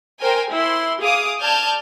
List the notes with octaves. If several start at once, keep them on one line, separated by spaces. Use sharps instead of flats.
A#4 C5 G5 G#5
E4 C6
G#4 F5 D6 D#6
D5 A5 F6 G6 G#6